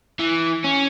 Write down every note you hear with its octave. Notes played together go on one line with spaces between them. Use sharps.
E3
C#4